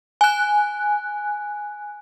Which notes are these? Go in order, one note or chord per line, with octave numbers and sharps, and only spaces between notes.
G#5 F#6